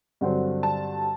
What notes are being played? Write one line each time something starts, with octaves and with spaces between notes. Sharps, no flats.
G2 D3 F#3 C4
A5